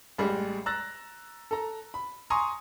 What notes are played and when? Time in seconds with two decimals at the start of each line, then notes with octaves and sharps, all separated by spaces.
0.18 A1 G3 G#3 G#4
0.66 A#5 E6 F#6 A6 A#6
1.51 A4 A#5
1.94 B5
2.30 G#5 A#5 C6 C#6 D#6